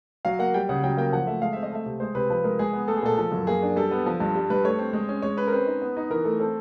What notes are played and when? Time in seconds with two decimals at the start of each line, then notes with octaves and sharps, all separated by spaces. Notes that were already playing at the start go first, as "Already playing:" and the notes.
0.25 F#3 F5
0.39 A#3 F#5
0.54 G3 G5
0.69 C#3 F#5
0.84 F#3 G5
0.97 A#3 G5
1.12 F3 F#5
1.27 A3 E5
1.42 G#3 F5
1.53 C4 E5
1.63 D#5
1.72 A3 E5
1.86 C3
2.00 G#3 C5
2.15 C3 B4
2.30 F3 B4
2.44 G#3 A#4
2.59 G#3 G#4
2.73 B3
2.88 A3 A4
2.97 G#4
3.03 A#2 A4
3.18 F3
3.32 F#2
3.47 A#3 G#4
3.62 D4
3.76 G3 A4
3.91 B3
4.06 F3
4.20 G2
4.35 G3
4.50 G2 B4
4.64 A3 C#5
4.79 C4
4.93 G#3
5.09 C#4
5.22 G#3 C#5
5.37 C#4 B4
5.47 A#4
5.52 C4 B4
5.66 D#4
5.82 B3
5.97 D#4
6.10 E3 A#4
6.25 A3 A4
6.40 C4 A4